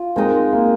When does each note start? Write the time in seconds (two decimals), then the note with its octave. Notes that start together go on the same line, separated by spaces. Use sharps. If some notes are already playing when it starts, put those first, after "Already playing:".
Already playing: F4
0.16 G#3 C4 D#4 A#4 D#5
0.53 A#3